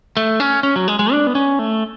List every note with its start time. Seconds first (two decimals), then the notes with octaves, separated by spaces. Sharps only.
0.17 A3
0.40 C#4
0.63 C#4
0.76 F#3
0.88 G#3
0.99 G#3
1.12 D4
1.27 B3
1.35 C#4
1.59 A3